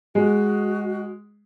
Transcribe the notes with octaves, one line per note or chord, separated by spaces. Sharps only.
G#3 F#4